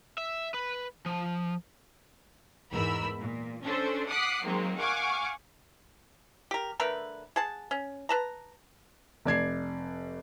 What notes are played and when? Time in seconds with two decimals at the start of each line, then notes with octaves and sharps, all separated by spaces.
0.18 E5
0.54 B4
1.06 F3
2.71 E2 G#2 A#4 B5 E6
3.19 A#2
3.64 C#4 D4 A4 C5
4.07 F#5 D6 D#6 F#6 B6 C7
4.45 D#3 F#3 G#3 A#3 C4
4.77 F5 F#5 G#5 C#6 D6
6.51 G4 A#4
6.80 D3 A3 A#4 B4
7.36 G#4 F#5 A5
7.71 C#4
8.09 B4 A5 A#5
9.25 F1 D5 G#6 C7